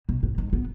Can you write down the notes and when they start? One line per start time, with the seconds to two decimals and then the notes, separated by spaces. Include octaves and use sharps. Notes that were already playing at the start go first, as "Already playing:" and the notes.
0.09 B2
0.23 G#2
0.38 G#2
0.53 B3